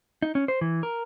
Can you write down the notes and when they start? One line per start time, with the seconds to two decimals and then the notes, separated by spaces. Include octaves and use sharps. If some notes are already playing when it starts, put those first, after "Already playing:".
0.22 D#4
0.35 C#4
0.48 C5
0.61 E3
0.83 A#4